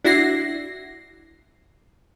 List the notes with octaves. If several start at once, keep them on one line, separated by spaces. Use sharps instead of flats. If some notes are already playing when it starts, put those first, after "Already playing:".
D4 E4 F#4 A#6 C7